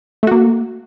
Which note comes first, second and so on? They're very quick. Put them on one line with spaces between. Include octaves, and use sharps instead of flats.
A3 F#4 A#3